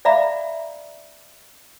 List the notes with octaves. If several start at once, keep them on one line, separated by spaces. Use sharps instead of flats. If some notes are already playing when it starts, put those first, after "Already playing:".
D5 E5 F5 A#5 B5